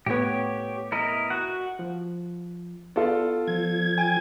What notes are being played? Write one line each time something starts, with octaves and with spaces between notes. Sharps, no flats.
A2 B3 G4 C#5
E4 A#4 D#5
F#4 F#5
F3
B3 F4 A4 D5
F3 G#6
G5 G#5